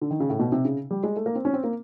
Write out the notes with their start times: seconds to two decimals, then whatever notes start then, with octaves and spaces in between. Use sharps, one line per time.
0.01 D3
0.11 D#3
0.20 C#3
0.30 A2
0.39 B2
0.52 C3
0.65 C#3
0.91 G3
1.04 G#3
1.16 A3
1.26 A#3
1.35 C4
1.45 C#4
1.54 C4
1.64 A#3